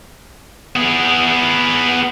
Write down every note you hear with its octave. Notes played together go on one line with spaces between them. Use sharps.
B3 G#4